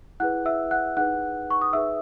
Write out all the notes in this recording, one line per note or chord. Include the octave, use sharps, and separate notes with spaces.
E4 G#4 B4 F#5 F#6
E5 E6
F#5 F#6
D#4 G#4 B4 F#5 F#6
C#6
D#6
D#4 G#4 B4 E5 E6